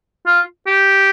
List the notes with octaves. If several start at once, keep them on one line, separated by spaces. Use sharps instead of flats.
F4
G4